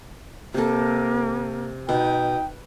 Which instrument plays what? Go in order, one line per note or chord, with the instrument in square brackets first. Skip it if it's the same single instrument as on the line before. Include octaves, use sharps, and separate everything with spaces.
[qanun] C3 A4 [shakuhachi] A#3
[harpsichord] B2 [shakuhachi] D#4 [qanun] B4 [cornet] G5